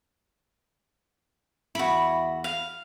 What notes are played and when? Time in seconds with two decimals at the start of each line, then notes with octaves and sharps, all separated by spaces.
1.75 E2 E4 F#4 B5
2.44 F5